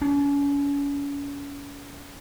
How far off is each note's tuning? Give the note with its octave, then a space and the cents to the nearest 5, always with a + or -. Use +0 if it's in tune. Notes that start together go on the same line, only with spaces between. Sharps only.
C#4 +35